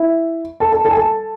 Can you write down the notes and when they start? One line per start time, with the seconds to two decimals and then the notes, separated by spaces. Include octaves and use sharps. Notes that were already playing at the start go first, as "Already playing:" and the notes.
Already playing: E4 E5
0.60 A4 A5
0.72 A4 A5
0.85 A4 A5
0.91 G#5
0.97 A4 A5